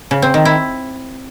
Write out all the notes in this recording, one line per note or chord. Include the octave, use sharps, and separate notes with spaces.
C#3
C4
D#3
E4